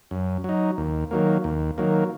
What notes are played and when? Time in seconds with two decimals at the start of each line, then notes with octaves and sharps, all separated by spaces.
0.11 F#2
0.44 F#3 D#4
0.78 D#2
1.11 D#3 F#3 A#3
1.44 D#2
1.78 D#3 F#3 A#3